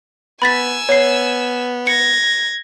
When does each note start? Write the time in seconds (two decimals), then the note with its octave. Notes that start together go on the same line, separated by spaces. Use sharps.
0.42 B3 G#5 B5 E6 A6 B6
0.89 B3 C#5 C7
1.87 G#6 A#6 C#7